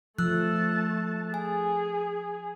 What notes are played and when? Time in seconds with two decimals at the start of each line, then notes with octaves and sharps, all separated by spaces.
0.19 F3 A3 A5 E6 F#6
1.34 G#4 G#5